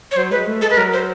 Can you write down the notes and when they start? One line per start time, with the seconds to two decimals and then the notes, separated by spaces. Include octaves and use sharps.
0.12 C#5
0.16 F#3 C5
0.31 G#3 B4
0.47 A3
0.62 G#3 A4
0.70 B4
0.77 F#3 A#4
0.93 C5